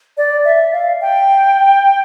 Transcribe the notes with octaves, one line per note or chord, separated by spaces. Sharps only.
D5
E5
F5
G5